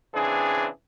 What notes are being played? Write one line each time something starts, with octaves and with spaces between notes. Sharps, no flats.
C#3 E3 C4 D4 G#4